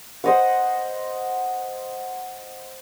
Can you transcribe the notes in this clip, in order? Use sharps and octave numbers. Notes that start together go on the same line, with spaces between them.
C5 D#5 F#5